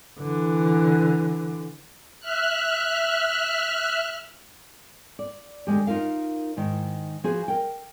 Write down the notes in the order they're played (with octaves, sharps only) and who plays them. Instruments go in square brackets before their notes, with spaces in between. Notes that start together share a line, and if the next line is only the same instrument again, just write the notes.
[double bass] D3 E3
[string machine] E5 F6 F#6
[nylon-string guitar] D5
D#2 D3 F3 G#3 G4
D#4 F4 A#4 F5
G#2 D#3
F3 F#4 G#4 B4 C5
A#4 G5